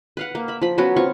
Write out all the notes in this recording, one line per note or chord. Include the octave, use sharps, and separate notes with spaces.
B4 F5 F#5
A#3
E5 B5
F3 B5
F#3 B3 C#4 F#4
C4 F4 C#6